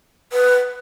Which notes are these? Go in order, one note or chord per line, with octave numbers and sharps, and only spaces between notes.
B4